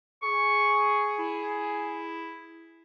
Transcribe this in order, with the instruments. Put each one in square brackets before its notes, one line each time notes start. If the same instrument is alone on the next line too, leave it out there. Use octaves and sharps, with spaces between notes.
[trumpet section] G#4 [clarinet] C#6
[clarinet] E4